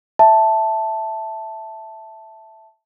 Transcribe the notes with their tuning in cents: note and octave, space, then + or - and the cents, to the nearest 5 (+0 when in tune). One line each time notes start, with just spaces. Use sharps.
E5 +0 A5 +0